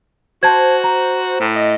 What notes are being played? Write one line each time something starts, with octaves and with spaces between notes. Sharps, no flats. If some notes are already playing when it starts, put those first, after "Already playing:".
F#4 C5 A5 G#6
A#5
A2
D#5